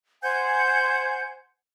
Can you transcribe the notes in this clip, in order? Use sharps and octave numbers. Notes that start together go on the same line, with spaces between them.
C5 F#5 G#5 G6